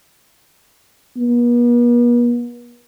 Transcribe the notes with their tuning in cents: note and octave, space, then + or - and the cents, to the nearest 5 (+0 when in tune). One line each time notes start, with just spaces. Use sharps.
B3 -45